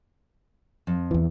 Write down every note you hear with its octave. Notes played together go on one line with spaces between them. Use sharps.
F2
E2 E3